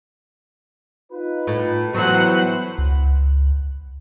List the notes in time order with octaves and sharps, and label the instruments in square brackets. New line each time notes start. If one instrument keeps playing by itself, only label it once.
[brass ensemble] D#4 F4 B4
[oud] A2
[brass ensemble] A2 B3 B4 [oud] E3 F#3 [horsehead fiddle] C5 F#5
[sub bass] C#2